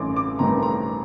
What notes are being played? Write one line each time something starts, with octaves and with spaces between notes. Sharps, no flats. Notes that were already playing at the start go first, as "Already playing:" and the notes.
Already playing: A1 G2 D#3 A3 C6 D6
D6
G2 D#3 A3 C4 A#5
A#5